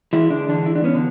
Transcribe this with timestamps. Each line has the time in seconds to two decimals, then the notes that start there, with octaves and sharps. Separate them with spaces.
0.13 E3 G#3 E4
0.30 D3 D4
0.48 D3 E3 D4
0.66 E4
0.76 D4
0.84 B3 C#4
0.95 D3